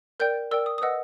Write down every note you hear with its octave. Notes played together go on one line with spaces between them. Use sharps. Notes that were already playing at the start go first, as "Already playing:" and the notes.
A#4 D5 G5 G6
A#4 D5 G5 E6
D#6
D#6
B4 D#5 F#5 E6